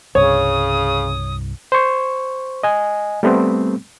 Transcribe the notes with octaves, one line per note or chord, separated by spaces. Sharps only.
C2 G2 C#3 C#5 D#6
C5 C#6
D#5 G#5
G3 A3 B3 C4